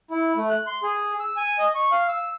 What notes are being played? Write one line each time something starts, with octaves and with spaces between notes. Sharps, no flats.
E4
A3
F#6
C6
G#4
E6
G#5
D#5
C#6
F5
E6